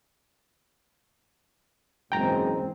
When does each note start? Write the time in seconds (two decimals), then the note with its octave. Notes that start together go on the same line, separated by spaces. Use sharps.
2.12 F#1 G#2 E3 G#3 C4 G5 A#5